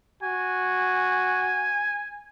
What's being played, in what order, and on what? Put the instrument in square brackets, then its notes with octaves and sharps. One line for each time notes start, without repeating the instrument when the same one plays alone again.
[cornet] F#4 [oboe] G#5